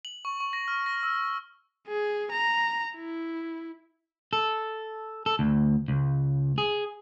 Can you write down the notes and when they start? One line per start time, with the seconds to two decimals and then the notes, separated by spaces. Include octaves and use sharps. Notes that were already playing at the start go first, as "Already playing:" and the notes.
0.05 F#7
0.25 C#6
0.40 C#6
0.53 A#6
0.68 F6
0.86 A#6
1.03 E6
1.87 G#4
2.31 A#5
2.95 E4
4.33 A4
5.26 A4
5.39 D2
5.88 C#2
6.58 G#4